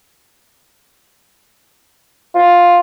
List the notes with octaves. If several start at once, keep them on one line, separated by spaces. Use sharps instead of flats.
F4